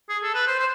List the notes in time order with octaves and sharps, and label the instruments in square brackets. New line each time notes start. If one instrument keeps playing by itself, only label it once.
[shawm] G#4
A4
B4
C5
C5